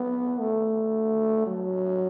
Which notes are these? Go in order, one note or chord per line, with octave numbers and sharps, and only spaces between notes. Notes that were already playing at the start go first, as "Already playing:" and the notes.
Already playing: B3
A3
F#3